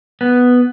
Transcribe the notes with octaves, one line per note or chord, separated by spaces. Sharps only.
B3